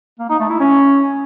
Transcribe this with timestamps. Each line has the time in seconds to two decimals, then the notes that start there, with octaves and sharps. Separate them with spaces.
0.19 A#3
0.29 D#4
0.40 A3
0.50 E4
0.60 C#4